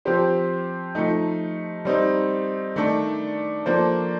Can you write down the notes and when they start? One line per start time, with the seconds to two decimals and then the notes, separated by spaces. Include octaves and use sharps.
0.05 F3 C4 G4 C5
0.95 F3 A3 D#4
1.85 G3 C4 D#4
2.76 D#3 A3 D4 A4
3.66 F3 A#3 D4 A4 C5